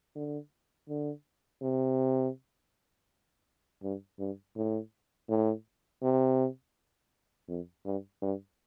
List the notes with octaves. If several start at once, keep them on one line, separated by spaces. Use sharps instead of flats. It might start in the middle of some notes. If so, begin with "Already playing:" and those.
D3
D3
C3
G2
G2
A2
A2
C3
F2
G2
G2